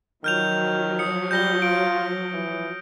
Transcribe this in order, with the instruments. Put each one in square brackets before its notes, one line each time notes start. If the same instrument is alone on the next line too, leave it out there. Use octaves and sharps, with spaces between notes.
[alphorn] D#3 [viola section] F3 F#3 [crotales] F6 G6 F7
[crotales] D#6 C#7
[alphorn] G3 [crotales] G6 A#6 G7
[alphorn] F4 [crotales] D7
[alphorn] E3